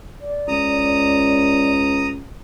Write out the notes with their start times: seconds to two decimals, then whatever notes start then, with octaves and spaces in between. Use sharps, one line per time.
0.21 D5
0.48 C#2 A#5 D#6